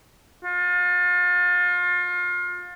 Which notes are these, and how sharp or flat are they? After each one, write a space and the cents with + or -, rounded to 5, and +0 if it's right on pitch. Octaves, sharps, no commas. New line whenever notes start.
F4 +35